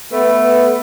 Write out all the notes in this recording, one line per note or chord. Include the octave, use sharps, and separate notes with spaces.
A3 B3 B4